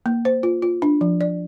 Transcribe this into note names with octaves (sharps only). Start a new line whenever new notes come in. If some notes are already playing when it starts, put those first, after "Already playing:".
A#3
C5
F4
F4
D4
F3
D5